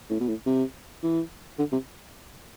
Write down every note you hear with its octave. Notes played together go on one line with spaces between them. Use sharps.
A2
B2
A2
C3
E3
D3
C3